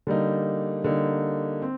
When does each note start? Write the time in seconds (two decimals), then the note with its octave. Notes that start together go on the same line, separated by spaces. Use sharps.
0.07 D3 G3 A#3 D#4
0.84 D3 G3 A#3 D#4
1.62 C4